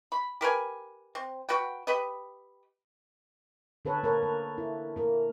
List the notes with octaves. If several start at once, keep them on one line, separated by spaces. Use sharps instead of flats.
B5
G4 A#4 B4 G#5
C4
F#4 B4 F#5 G5
G4 B4 D#5
D3 A4 B4 C#5
A#3 A#4 C#5
A#3
E4
A#3 A#4